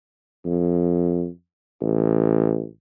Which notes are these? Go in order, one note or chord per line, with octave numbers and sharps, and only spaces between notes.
F2
A1